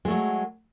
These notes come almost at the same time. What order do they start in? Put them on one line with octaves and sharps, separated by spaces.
G#3 A3 F#3